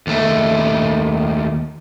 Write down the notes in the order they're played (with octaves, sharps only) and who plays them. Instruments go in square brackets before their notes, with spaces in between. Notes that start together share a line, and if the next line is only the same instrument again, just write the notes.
[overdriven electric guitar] D#2 A3